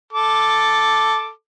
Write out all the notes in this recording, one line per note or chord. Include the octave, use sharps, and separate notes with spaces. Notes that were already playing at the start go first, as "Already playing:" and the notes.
A4 D6